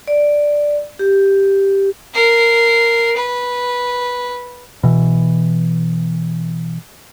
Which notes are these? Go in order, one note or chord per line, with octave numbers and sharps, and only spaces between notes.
D5
G4
A#4 C7
B4
B2 E3